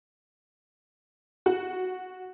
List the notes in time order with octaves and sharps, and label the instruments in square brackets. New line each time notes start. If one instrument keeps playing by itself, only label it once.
[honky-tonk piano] F#4